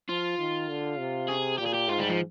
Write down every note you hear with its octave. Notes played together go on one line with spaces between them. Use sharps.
F3 F4
D#3
D3
C3
G#4
A#2 G4
G#4
G4
G#2 F4
G3
F3